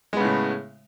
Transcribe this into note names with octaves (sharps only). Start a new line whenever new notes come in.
A2 C#3 G#3 B3